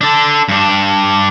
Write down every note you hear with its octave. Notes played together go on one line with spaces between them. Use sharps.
D4 A4
G2 D4